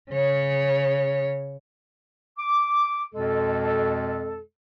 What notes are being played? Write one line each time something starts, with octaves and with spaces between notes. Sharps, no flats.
C#3 C#5
D6
F2 B2 G#3 A4